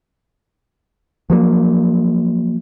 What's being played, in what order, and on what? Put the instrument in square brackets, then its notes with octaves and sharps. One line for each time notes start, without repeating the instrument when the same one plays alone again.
[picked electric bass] F3 F#3 A#3